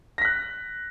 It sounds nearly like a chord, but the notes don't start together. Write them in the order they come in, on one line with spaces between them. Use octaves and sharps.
A#6 B6 F#6